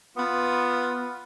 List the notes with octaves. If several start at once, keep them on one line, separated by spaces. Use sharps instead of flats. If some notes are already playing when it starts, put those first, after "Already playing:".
B3 F4